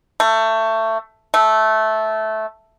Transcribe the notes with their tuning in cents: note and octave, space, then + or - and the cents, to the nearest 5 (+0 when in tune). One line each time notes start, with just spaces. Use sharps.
A3 +20
A3 -10